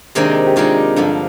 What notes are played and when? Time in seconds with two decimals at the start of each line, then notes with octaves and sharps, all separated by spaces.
0.15 C3 D#3 G#3 A#3 C4 D4 D#4
0.46 G4
0.56 C3 D#3 G#3 C4 D4 D#4 F4
0.96 G2 D3 F3